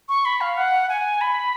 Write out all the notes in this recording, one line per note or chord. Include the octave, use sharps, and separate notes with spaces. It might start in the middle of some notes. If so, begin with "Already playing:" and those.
C#6
B5
F5
F#5
G#5
B5